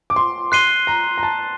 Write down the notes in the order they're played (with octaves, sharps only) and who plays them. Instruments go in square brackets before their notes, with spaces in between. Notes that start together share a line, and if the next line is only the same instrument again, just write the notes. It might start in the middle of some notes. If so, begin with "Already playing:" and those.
[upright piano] D6
C6
[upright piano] C6 [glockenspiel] F#6 C7 D#7 G7
[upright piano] A#5
A#5
A5